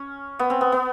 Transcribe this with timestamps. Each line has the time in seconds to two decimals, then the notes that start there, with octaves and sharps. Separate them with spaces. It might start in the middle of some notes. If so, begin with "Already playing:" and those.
Already playing: C#4
0.39 B3
0.50 C4
0.61 B3
0.72 B3